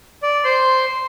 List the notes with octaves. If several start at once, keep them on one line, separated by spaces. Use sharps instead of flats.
D5
C5 C6